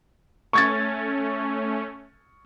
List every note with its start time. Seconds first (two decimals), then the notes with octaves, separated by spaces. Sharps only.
0.53 A3 C#4 C#6 G#6 A6